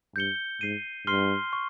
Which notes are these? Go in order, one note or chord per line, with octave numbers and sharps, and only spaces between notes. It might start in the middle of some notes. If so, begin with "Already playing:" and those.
G2 G6 C#7 G7
G#2 G6 C7 D#7
G2 C6 F6 C7 G7
C#6